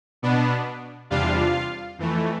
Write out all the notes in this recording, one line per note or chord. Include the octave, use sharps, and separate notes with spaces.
B2 B3 D4
E2 C3 G3 D4 F4 F5
F2 E3 A3